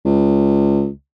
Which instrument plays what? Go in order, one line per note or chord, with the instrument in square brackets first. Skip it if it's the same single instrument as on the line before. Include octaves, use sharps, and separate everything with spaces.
[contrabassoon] C#2